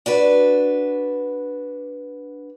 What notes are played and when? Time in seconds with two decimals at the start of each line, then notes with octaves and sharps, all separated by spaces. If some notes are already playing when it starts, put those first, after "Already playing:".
0.06 D4 F#4 B4